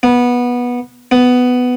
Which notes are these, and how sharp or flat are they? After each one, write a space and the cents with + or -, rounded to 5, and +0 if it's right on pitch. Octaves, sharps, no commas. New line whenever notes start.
B3 -15
B3 +10